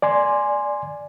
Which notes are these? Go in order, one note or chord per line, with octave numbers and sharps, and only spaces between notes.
D5 G#5 C6